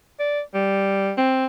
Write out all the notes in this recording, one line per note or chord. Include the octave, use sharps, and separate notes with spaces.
D5
G3
C4